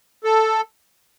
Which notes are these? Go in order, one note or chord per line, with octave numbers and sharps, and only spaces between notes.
A4